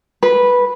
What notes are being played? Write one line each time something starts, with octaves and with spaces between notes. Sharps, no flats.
B4